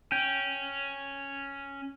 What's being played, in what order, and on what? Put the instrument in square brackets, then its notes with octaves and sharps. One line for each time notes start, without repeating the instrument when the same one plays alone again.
[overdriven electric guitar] C#4 [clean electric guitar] G5